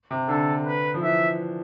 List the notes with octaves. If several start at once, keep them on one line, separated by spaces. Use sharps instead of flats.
C3
D3 A4
B4
F3
E3 E5